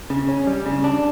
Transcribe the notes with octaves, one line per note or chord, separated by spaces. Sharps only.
C#3
C#4
G3
C#3
D4